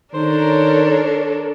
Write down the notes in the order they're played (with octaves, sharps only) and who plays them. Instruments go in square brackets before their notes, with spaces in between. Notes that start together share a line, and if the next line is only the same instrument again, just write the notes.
[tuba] D#3 [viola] D4 A4 [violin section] A#4 C#5 [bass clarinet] C5